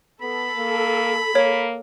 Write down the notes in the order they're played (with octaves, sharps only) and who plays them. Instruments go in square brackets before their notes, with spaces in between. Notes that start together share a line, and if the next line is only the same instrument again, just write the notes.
[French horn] B3 [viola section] A4 [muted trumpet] B5
[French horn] A#3
[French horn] A#3 [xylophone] C#5